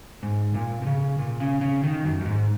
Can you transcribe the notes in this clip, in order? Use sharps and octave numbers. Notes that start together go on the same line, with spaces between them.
G#2
A#2
A#2
C#3
A#2
C#3
C#3
D#3
F#2
F#2
G#2